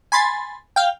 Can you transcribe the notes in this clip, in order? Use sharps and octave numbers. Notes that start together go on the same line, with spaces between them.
G#5 B5 C6 A6
F5 G5